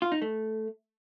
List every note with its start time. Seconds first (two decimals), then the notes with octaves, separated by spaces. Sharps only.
0.02 F4
0.12 D#4
0.22 A3